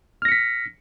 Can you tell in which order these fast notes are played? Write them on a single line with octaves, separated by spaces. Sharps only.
F6 A#6 C#7 B6